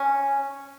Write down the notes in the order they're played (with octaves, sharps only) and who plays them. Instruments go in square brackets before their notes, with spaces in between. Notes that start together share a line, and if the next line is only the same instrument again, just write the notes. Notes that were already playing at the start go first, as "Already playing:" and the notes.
Already playing: [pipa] C#4